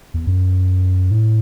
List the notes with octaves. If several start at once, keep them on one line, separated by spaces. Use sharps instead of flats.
E2
F#2
A2